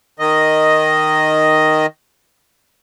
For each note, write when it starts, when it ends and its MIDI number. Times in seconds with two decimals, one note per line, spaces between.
0.19 1.86 51
0.19 1.86 75